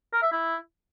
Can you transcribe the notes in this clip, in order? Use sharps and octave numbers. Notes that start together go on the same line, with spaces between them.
A#4
E5
E4